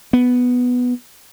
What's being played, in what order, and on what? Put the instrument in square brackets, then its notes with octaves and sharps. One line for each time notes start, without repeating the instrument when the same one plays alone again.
[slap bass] B3